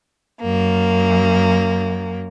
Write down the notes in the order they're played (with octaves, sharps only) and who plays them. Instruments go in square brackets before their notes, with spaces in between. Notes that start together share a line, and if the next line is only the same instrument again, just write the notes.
[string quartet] F#2 A#3